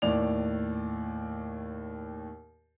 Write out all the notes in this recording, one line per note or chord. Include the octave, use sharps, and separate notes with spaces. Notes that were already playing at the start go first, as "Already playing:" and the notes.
D#2 A2 D5 F7